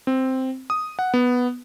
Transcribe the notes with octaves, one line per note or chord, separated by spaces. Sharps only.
C4
D#6
F#5
B3